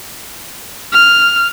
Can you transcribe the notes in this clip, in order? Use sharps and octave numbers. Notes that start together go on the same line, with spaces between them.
F6